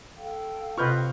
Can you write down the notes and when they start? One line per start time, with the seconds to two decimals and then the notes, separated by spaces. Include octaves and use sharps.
0.16 A4 F5 G5
0.78 C3 F4 B4 D#5 C#6 F6 G6